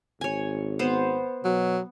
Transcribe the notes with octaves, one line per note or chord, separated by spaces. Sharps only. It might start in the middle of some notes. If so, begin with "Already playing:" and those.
G#1 C#5 G#5
B3 C5
B2 F#3